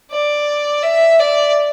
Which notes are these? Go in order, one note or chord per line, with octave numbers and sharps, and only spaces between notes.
D5
E5
D5